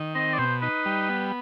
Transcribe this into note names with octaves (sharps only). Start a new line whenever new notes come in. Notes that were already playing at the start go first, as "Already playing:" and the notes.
Already playing: D#3
C4 D#5
D5
B2 C5
D#4 B4
G3
B3